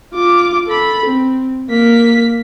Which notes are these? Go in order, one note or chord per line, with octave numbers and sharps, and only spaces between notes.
F4 D6
A4 B5
C4
A#3 B6